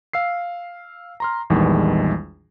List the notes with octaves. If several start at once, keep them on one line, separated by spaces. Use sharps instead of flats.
F5 E6 C7
A#5 C6 F6
A#1 E2 D#3 E3 G3 G#3